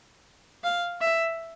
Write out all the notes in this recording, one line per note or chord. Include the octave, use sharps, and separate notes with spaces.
F5
E5